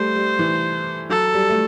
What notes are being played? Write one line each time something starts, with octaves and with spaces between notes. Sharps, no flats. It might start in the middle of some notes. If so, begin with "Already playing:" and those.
Already playing: G3 A3 C5
G3
E3
F#3 A4
G3
A3